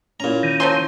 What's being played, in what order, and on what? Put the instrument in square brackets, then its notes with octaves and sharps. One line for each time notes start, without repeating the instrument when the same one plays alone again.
[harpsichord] A#2 A#5 [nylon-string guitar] C#4 E4
[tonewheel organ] D#3
[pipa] F3 F#3 C6 [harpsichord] G#5